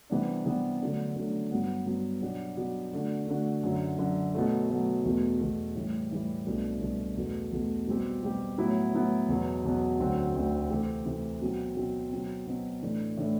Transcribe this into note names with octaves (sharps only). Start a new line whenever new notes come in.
C3 E3 G3 B3 D4
C3 E3 G3 B3 D4
D3 F#3 A3 D4
D3 F#3 A3 D4
G2 F#3 B3
G2 F#3 B3
B2 F#3 B3 D4 G4
B2 F#3 B3 D4 G4
D3 A3 D4 F#4
D3 A3 D4 F#4
F#2 D3 F#3
F#2 D3 F#3
B2 F#3 A3
B2 F#3 A3
E2 B2 A3
E2 B2 A3
A2 E3 G3
A2 E3 G3
C2 B2 A3 D4
C2 B2 A3 D4
E2 B2 A3
E2 B2 A3
B2 G3 C4 G4
B2 G3 C4 G4
A2 F#3 B3 E4
A2 F#3 B3 E4
E2 B2 F#3 B3
E2 B2 F#3 B3
D2 D3 F#3 C4 F#4
D2 D3 F#3 C4 F#4
C3 E3 A3 C4 G4
C3 E3 A3 C4 G4
B2 F#3 C4
B2 F#3 C4
B2 F#3 C4
B2 F#3 C4
A2 E3 A3 D4
A2 E3 A3 D4